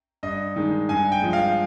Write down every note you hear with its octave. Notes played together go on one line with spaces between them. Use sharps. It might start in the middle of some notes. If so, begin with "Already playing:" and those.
G2 D#5
D#3 G#3
G2 G#5
G5
F3 G#3
F5